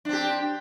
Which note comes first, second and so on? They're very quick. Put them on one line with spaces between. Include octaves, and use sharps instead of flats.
D4 C4 G4